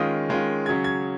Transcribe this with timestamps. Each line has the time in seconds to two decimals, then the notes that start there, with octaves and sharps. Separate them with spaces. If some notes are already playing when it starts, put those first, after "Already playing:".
Already playing: D#3 G#3 C#4 F4 D#6
0.29 D#3 G#3 C#4 F4
0.66 C#3 F#3 C#4 G#6
0.84 G#6